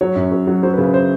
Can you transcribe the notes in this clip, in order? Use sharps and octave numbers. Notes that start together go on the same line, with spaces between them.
F#3 C#5
F#2
F#3
F#3
F#3 C5
B4
C#3
B4
C5